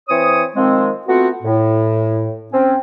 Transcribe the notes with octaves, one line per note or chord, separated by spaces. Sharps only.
E3 C4 C#5 D#6
D#3 F3 G#3 C4
A3 B3 C4 F4 F#4 F#5
A2
C4 C#4